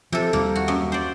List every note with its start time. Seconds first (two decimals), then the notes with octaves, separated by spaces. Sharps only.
0.12 C3 F3 A4
0.33 D#2 D#3 G3 A#3
0.55 F#4
0.68 F#2
0.92 C5 D5